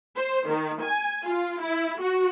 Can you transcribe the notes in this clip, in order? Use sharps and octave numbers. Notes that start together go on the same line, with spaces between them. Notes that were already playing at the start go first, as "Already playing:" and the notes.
C5
D#3
G#5
F4
E4
F#4